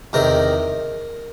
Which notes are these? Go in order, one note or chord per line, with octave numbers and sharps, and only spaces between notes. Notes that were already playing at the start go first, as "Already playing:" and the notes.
E2 C3 D#3 A#4